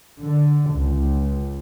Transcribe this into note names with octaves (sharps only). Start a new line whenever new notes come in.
D3
C#2